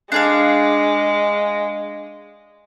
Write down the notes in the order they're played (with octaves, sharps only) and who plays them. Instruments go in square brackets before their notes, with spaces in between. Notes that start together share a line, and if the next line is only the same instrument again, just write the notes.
[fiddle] G#3 [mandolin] D4 G#4 F5